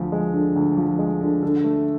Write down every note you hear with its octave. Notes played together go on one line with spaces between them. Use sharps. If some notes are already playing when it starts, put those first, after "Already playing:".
Already playing: D2 F3
G#3
D3
D2
F3
G#3
D3
D3
A3